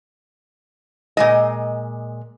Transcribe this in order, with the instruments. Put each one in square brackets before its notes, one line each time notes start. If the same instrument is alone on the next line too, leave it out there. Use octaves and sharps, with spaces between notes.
[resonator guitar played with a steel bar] A#2 G#3 D#5